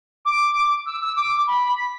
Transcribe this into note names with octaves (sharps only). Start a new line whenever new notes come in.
D6
E6
E6
D6
B5
B6